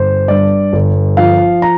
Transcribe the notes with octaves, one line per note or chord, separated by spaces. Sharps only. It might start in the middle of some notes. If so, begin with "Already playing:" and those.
Already playing: G1 C5
G2 D5
G1
F3 F5
A#5